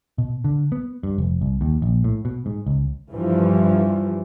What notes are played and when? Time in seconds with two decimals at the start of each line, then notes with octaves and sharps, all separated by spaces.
0.18 B2
0.44 D3
0.72 B3
1.03 G2
1.18 F1
1.41 C2
1.61 D#2
1.82 A#1
2.04 A2
2.25 B2
2.46 G#2
2.66 C#2
3.14 G2 E3 F3 G3